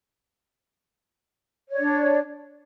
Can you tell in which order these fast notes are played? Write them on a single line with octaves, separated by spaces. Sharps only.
C#5 D5 D4